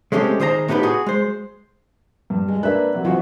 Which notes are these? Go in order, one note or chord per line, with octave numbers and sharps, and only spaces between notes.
G#3 A3 C4 C#4 G4
D#3 G#4 C5 C#5 A#5
A2 B3 D#4 G4 B4
F#4 G#4
G#3 C5
G2
G#3
A#3 D4 B4 E5 F#6
C3 F#3 A#3
E3 C4 F4 F#4 D#5